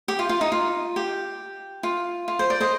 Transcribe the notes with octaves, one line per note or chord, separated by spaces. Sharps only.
G4
F4
F4
D#4
F4
G4
F4
F4
C5
D5
C5 D#5